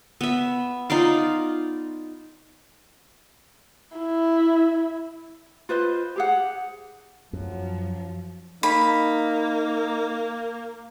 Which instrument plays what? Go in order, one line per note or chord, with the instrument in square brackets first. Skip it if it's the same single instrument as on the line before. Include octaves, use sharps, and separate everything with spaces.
[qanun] B3 E5
D#4 F4 D5 F5
[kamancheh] E4
[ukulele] F4 B4 C5 D#5
G4 G#4 F#5
[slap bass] F#2 [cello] F3 [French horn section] F#3
[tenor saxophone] A#3 [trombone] D#4 [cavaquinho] B5